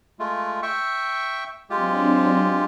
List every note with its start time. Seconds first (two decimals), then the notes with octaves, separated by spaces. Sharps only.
0.19 G#3 A3 F4
0.63 E5 G5 C#6
1.70 F#3 G#3 C4 D4 F4 G4